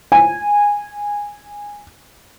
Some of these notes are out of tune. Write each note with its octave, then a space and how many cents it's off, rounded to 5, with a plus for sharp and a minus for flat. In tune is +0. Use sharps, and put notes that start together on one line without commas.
G#5 -15